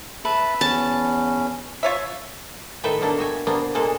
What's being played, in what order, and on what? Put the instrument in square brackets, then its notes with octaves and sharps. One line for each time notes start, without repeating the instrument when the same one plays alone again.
[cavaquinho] B4 [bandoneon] E5 A5
[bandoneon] E2 C#4 [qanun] A5
[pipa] F4 C#5 E5
[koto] A2 D#3 A4 B4 E5 G5
B2 A#3 D4 A4
F#4 G4 E5 G#5
C3 A#3 B3 D4
A#2 G#3 A#3 A4 A5